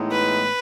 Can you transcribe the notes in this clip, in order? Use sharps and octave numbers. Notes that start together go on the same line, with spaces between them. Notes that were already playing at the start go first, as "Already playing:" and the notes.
Already playing: A2 E3 G#3 B3 D#4
B4